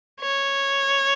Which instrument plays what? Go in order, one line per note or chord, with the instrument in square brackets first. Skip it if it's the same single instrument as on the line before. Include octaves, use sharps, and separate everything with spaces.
[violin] C#5